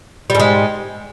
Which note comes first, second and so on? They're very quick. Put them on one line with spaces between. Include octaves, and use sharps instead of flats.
G3 G#2 G#3